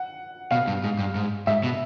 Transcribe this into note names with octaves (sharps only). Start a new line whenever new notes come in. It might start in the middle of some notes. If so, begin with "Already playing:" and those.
Already playing: F#5
B2 F5
G2
G#2
G2
G#2
G#2 E5
B2